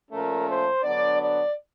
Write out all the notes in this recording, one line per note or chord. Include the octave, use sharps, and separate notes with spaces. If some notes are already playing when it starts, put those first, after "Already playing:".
A#2 F3 A3 C#4 A#4
C5
D3 F#3 B3 D4 D5
D5